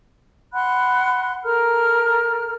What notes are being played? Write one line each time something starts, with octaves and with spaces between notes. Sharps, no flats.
F#5 B5 C6 F#6
A4 A#4 A#5 F6